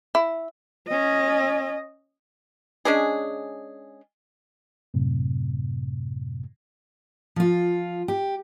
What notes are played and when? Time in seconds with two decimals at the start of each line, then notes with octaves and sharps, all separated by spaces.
0.15 E4
0.88 C#4 D#5
2.85 G#3 C#4 D4 G#4
4.94 F#2 A2 C3
7.36 F3 F4
8.08 G4